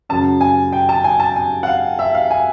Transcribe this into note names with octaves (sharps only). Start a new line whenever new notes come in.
F#2 C#3 F#3 A5
G#5
G5
A5
G#5
A5
G#5
F#5
F5
E5
F5
G#5